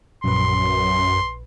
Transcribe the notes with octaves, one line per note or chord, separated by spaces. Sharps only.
A#1 F#2 B4 C6